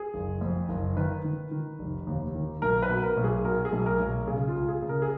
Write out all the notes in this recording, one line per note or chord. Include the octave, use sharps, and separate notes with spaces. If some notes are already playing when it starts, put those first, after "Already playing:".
Already playing: G#4
F#1
F2
F#1
D#3 B4
D#3
D#3
F1
D#2
D#3
B1 A#4
B4
B2
A#4
B1
G#4
B2 A#4
G#4
B1
A#4
B1
C#3 G#4
F4
C#2
G#4
C#3
A#4
G#4